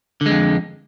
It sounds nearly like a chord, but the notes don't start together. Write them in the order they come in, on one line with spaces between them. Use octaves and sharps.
D3 G#3 F2